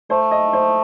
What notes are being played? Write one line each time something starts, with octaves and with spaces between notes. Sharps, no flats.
A3 C5
D#5
C5